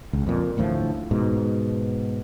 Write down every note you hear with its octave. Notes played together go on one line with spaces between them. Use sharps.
C#2
F2 A#2
A1 D2 A2 F3
G#2 B2